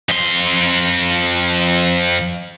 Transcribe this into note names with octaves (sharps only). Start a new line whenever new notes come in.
F2 C6